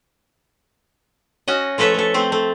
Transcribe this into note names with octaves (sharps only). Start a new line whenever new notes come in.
C#4 F#4 D#5
F3 A3 A4 B4 C#5 E5
A3 A4
A3 C4 C5
A3